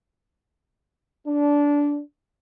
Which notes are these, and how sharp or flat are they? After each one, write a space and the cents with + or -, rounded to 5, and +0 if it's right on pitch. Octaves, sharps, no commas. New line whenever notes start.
D4 -15